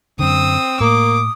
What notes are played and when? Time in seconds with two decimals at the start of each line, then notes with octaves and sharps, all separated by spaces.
0.19 F#2 D3 C4 D#6 E6
0.80 A2 A#3 D6 D#6